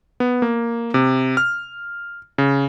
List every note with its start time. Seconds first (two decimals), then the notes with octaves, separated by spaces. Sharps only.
0.20 B3
0.42 A#3
0.94 C3
1.37 F6
2.38 C#3